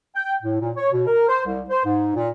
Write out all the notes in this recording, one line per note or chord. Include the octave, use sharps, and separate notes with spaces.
G5
A2
A#2
C#5
B2
A#4
C5
C2
C5
G#2
A#2